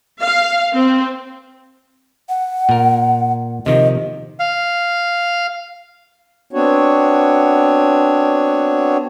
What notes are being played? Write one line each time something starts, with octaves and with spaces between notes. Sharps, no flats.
F5
C4
F#5
A#2 A#4
C3 D#3 F3 D#5
F5
B3 C4 D4 F#4 C#5